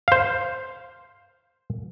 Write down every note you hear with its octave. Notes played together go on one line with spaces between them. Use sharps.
C5 F5